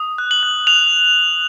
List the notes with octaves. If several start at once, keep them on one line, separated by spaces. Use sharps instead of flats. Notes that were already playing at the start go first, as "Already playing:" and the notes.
Already playing: D#6
F#6
F#7
F#6
F#6 F7